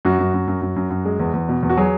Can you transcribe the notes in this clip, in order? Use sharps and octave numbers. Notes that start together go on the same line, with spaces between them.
F#2 F#4
F#2
F#2
F#2
F#2
F#2
F#2
G#3
E2
E2
B2
E2
F#4
F#3 G#4